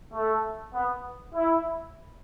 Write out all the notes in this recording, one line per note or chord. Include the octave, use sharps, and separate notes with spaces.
A3
B3
E4